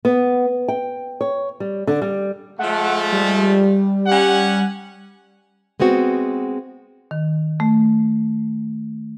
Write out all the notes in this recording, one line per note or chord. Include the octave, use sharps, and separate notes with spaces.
B3
G5
C#5
G3
D3
G3
F3 G#3 A3 F#5
G3
C#4 G4 F#5
G#3 B3 C4 F#4
D#3
A3